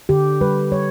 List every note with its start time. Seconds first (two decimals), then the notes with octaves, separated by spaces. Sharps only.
0.09 D3 G4
0.41 G3 B4
0.72 G3 C#5